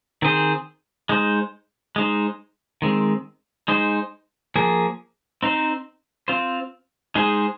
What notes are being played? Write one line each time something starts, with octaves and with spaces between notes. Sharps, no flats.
D#3 C4 G#4 C5
G#3 D#4 C5
G#3 D#4 C5
D#3 G#3 C4
G#3 D#4 C5
F3 A#3 G#4
C4 D#4 C5
C4 F4 C5
G#3 D#4 G#4 C5